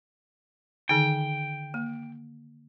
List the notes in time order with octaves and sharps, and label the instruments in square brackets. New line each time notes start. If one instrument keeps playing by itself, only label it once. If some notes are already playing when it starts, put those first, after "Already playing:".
[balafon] D3 D#3 D#4 [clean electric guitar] G5
[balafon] A#3